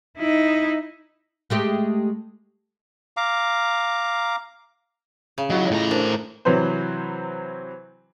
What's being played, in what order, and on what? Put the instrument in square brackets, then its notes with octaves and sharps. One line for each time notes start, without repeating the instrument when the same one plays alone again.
[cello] D#4 E4
[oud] G#3 A3 G4
[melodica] F5 A#5 D6
[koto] C#3
[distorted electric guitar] F#3 [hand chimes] E4 F4 D#5
[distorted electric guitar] A2 A#5
[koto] D4 [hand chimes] A#4 C5
[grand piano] C3 E3 F#3 C4 B4 C5